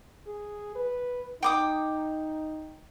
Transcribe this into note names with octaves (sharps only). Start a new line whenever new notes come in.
G#4
B4
D#4 G5 D6 D#6